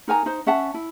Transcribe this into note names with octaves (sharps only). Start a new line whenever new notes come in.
D#4 A#4 G#5 A#5
D#4 C5
C#4 E5 F#5 A5
E4